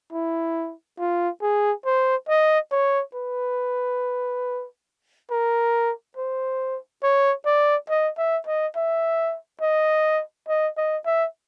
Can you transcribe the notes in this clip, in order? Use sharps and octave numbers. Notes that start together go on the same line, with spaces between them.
E4
F4
G#4
C5
D#5
C#5
B4
A#4
C5
C#5
D5
D#5
E5
D#5
E5
D#5
D#5
D#5
E5